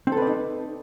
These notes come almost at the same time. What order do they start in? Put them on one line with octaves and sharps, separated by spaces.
C4 A4 B4 D5 D#4